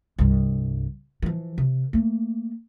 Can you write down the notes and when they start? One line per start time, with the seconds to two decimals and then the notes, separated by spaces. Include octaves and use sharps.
0.19 C2 G2
1.22 E3 F3
1.58 C3
1.93 A3 A#3